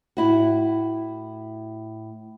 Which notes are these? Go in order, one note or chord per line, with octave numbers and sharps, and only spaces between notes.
A2 E4 F#4